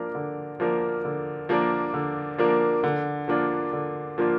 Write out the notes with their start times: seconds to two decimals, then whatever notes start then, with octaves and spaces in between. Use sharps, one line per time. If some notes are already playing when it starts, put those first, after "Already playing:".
Already playing: F3 A#3 D4 A#4
0.15 D3
0.60 F3 A#3 D4 A#4
1.05 D3
1.49 F3 A#3 D4 A#4
1.94 D3
2.38 F3 A#3 D4 A#4
2.84 D3
3.28 F3 A#3 D4 F4
3.73 D3
4.18 F3 A#3 D4 F4